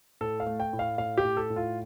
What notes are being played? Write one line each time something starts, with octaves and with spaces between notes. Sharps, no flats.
A2 A4
F5
A3
G5
A2
F5
A2 F5
G4
A2
A4
A2
F4